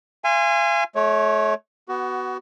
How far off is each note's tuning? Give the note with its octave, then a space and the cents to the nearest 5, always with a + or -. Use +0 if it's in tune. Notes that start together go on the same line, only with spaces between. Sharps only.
F5 -40 G#5 -15 C6 +0
A3 -35 C#5 +0
B3 +0 F#4 +20